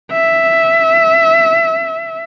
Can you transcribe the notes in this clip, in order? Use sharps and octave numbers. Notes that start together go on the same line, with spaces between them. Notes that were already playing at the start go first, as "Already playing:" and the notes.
E5